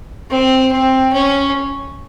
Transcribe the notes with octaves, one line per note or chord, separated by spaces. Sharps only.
C4
C4
C#4